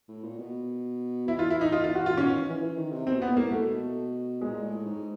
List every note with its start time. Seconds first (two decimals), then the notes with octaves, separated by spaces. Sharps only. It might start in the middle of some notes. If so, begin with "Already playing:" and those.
0.09 A2
0.24 A#2
0.39 B2
1.27 E3 E4
1.39 F4
1.50 E4
1.61 D#4
1.72 F4
1.84 F4
1.95 F#4
2.06 F4
2.17 D#3 C#4
2.29 D#3
2.39 E3
2.50 E3
2.63 E3
2.77 D#3
2.92 C3
3.07 B2 C4
3.18 A#2
3.22 B3
3.30 A#2
3.37 A#3
3.41 A2
3.51 B2 A3
4.41 A#2 G#3
4.64 A2
4.86 G#2